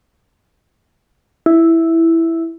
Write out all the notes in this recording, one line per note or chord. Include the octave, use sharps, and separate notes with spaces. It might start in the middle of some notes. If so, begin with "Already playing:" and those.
E4